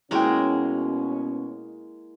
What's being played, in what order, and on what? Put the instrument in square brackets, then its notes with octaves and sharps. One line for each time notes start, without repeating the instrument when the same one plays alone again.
[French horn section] B2 C#4 [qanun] G#3 A#3 A#4 [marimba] E4 [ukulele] F#4 G5